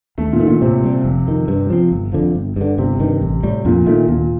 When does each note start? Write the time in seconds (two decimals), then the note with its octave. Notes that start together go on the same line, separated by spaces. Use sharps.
0.18 D#2 A3
0.33 A#2
0.40 D#3 A3
0.47 A#2
0.61 A2 C3
0.83 G3 C4
1.04 F1
1.27 F2 D#3
1.48 G2
1.70 F3 C4
1.92 G1
2.13 F2 D3 F3
2.35 G1
2.56 G2 D3
2.78 G1 C3
3.00 G2 D#3
3.21 A1
3.43 A2 G3
3.65 F2 A#2
3.86 A#2 D#3 A3
4.08 D#2 A#2